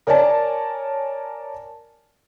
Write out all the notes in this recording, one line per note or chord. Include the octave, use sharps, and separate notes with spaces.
A#4 C#5 D5 G#5 A5